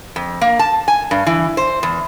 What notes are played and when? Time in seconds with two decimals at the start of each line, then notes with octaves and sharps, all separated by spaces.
0.16 F2
0.41 A#3
0.59 A5
0.88 G#5
1.11 G2
1.27 E3
1.57 C5
1.83 E2